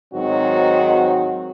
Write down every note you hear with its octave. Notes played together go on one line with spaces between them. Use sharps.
G#2 D#3 F#3 C4 F#4